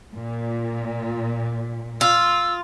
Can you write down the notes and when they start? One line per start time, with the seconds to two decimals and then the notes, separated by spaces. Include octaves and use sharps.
0.14 A#2
2.01 F4 E6